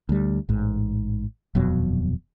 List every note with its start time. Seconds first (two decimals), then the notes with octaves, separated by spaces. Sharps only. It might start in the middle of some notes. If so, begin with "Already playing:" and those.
0.09 D2 G3
0.49 A1 G#2
1.55 D#1 F2 B2 F#3